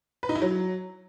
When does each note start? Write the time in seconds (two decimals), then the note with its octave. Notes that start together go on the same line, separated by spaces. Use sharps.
0.23 B4
0.29 D#4
0.35 E4
0.42 F#3